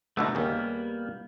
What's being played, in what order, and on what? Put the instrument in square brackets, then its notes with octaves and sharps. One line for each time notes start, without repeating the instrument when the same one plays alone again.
[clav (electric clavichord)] B2 D3 B3 [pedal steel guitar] A3 D#4
[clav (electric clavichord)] D#2 C#3 [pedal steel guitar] G3 A#3 B3